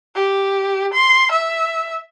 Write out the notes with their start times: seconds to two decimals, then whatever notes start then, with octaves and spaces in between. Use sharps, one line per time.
0.15 G4
0.93 C6
1.31 E5